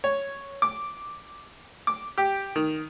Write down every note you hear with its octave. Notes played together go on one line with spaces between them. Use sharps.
C#5
D6
D6
G4
D#3